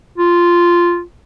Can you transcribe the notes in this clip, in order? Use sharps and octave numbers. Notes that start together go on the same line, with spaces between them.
F4